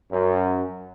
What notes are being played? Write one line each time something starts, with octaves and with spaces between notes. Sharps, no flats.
F#2